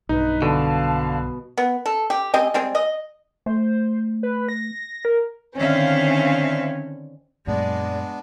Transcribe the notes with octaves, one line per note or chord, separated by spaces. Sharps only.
B1 G2 D#4 B4
B2 D3 F5 A5
B3
A4
G4
G#3 C4 G4 D#5
G3 G#3 C4
D#5
A3 C5
B4
A#6
A#4
D3 D#3 C4 C#4 E5 F5
F#2 A#2 F#3 G#3 B3 D4 D5